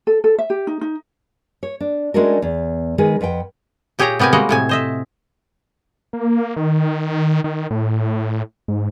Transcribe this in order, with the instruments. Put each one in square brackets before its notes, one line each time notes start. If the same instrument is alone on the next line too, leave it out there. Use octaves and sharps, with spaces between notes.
[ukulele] A4
A4
E5
G4
D#4
D#4
[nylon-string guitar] C#5
D4
G#3 A3 C#4 D4 F#4 A#4
E2
D#3 G#3 G#4 B4
F2 B4 F#5 G5
[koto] A#2 G4 G#4 C#5 G5 A#5
C3 B3 G4 A#4 G#5
G3 G#3 A#3 F#4 D#5 F#5
A2 C3 G#5
C5 D#5 E5
[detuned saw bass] A#3
D#3
D#3
A2
G#2